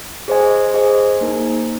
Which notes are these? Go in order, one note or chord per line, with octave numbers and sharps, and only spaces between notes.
G#4 C5 D#5 G#5
G#4 C5 D#5 G#5
A#3 D#4 A#4